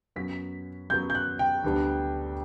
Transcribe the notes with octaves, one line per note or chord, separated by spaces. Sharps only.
F#2 F#3 B3 B6
F#2 F#3 B3 G6
G6
F#6
G5
D2 D3 G3 B3 D4